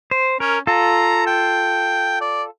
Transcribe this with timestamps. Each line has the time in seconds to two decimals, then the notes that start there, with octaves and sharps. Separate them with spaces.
0.11 C5
0.40 C#4 A#4
0.67 F4 A4 A#5
1.27 G5
2.21 D5